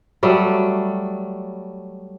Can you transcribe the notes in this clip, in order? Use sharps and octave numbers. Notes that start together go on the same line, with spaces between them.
F#3 G3 A3